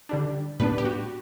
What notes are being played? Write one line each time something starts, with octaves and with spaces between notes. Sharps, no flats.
D3 G3 D4
A2 G3 B3 D4 B4
G4
F#4